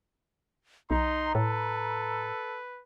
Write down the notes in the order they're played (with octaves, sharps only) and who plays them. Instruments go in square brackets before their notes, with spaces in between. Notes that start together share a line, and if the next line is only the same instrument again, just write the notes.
[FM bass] B1 [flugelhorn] D#4 [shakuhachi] A#5 [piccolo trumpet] C6
[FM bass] A2 [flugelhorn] A4 [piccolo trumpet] B4